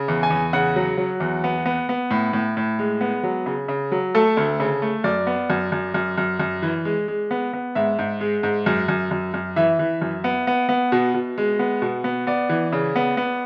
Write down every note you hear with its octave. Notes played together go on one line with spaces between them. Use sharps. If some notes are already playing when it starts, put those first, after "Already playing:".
Already playing: C#3
E2
G#5
E2
C#3 F#5
F#3
F#3
E2
B3
B3
B3
A2
A2
A2
G#3
B3
F#3
C#3
C#3
F#3
A3 A4
D2
C#3
A3
F#2 D5
B3
F#2
F#2
F#2
F#2
F#2
E3
G#3
G#3
B3
B3
G#2 E5
G#2
G#3
G#2
F#2
F#2
F#2
F#2
E3 E5
E3
F#2
B3
B3
B3
B2
B2
G#3
B3
B2
B3
B3 D5
E3
C#3
B3
B3